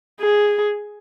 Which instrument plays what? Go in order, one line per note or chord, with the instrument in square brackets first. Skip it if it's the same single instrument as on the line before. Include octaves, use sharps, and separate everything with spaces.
[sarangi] G#4